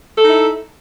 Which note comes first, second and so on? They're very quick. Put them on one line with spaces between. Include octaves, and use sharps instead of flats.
A4 D#4 E4